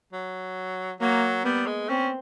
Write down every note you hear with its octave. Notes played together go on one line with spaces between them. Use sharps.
F#3
F#3 A#3
G3 B3
G#3
C4 C#4